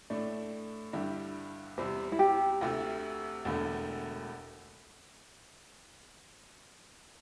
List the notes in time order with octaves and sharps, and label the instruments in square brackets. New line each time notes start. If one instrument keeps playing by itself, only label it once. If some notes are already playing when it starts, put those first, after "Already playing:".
[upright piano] A2 A3 D4
G2 D3 G3 E4 G4
[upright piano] E2 C3 G3 [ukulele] C5
[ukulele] E4
G4
[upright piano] D2 C3 A3
E1 E2 D3 A3